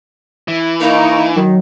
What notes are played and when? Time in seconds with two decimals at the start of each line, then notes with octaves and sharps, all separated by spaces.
0.48 E3
0.81 A#3 D#4 D#5 A#5 C#6
1.36 D#3 F#3